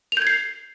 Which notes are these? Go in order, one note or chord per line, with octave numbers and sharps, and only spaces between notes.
G6 G#6 C7 F7